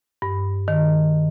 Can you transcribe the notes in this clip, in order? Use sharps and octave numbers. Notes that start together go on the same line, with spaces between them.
G2
D#3